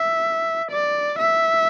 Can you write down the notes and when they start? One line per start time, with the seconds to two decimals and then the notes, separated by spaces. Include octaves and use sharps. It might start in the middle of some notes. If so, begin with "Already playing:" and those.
Already playing: E5
0.71 D5
1.18 E5